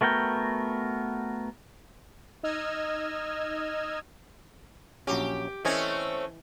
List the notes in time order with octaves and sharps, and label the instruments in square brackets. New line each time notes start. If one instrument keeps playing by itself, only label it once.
[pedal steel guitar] A3 B3 F#4 A#4 G5
[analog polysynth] D#4 D#5 E6 F6 G#6
[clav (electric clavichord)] A#1 F#3 C#4 [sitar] G4
[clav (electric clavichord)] E3 D#5 G#5 [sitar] A3 C4 C#4